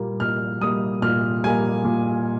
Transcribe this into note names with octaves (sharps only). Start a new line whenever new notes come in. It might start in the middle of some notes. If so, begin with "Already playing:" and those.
Already playing: A#2 G3 A#3
A#2 F6
G3 A#3 D#6
A#2 F6
G3 A#3 G#5
A#2